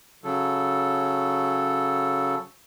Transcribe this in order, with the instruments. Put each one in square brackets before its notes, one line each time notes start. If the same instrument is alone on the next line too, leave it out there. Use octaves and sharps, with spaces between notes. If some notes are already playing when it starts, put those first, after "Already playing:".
[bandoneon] C#3 F#3 A4